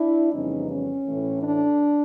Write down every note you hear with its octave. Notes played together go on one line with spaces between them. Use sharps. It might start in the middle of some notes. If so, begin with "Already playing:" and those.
Already playing: D4 E4
F2 C#3 E3 G3 B3 C#4 D#4
C#4
A2 E3 A3
D4